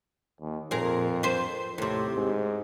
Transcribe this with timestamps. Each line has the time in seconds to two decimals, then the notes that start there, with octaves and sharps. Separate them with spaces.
0.41 D#2
0.71 F2 A#2 G#4 A#4
1.23 B4 C5
1.78 D#2 A2 C3
2.16 G#2